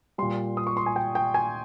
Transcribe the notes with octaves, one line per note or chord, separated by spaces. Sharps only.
A#2 G3 C6
D#6
C#6
C6
G#5
G5
G5
G#5